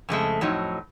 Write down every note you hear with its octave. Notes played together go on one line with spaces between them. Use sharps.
F2 C#3 G#3 A3
F2 A2 F#3 D#4